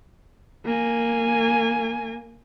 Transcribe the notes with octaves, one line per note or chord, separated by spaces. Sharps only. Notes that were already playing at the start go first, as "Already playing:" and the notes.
A#3 G#5